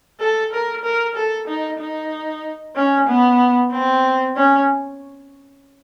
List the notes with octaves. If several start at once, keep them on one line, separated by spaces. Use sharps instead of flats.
A4
A#4
A#4
A4
D#4
D#4
C#4
B3
C4
C#4